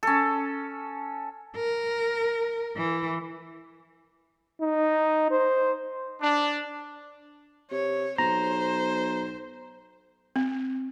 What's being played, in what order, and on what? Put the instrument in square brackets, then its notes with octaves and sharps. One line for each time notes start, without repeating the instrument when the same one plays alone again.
[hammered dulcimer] C#4 A4
[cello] A#4
E3
[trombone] D#4
C5
[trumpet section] D4
[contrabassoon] C3 [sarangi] C#5
[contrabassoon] B1 [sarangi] C5 [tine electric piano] A#5
[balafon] C4